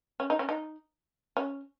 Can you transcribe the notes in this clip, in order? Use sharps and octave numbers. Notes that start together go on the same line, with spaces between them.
C#4
D#4
C#4
D#4
C#4